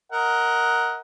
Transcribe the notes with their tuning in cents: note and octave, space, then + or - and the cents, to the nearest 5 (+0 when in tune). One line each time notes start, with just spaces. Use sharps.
A#4 +0 D#5 +20 F#5 +0